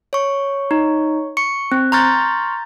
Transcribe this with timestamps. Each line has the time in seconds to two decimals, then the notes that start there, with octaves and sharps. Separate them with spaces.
0.13 C#5 C#6
0.71 D#4
1.37 C#6 C#7
1.72 C4
1.92 A#5 C6 C#6 F6 G6 A6